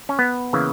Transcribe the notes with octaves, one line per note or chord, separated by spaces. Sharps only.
C#4
B3
C#3 E3 A#3